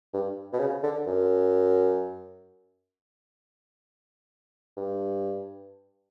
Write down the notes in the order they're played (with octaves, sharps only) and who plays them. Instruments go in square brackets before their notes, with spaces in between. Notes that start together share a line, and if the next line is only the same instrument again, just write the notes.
[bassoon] G2
B2
C#3
D3
F#2
G2